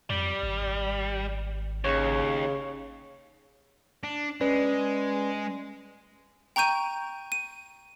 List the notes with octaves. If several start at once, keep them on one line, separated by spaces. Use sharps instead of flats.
F2 G3
G#1
D#2 C#3 C#5 C#6
D4
G#3 C#4 B4 D5
G5 A#5 C#6 G6 D#7
D#7